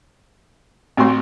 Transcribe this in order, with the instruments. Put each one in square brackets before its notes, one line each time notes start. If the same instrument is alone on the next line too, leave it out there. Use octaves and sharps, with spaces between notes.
[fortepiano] A1 F#4 C6 [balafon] A3 C4